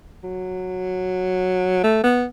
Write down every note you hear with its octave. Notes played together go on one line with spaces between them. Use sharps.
F#3
A3
B3